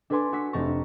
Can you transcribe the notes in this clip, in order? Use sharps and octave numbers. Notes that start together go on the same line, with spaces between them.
D4 A4 B4 G#5 C6 D6
D4 F#4 C#6 E6 B6
F1 A3 C4 A5 A#5 C#6